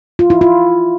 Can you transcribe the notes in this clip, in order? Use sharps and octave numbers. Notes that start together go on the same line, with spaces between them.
F4
E4
F4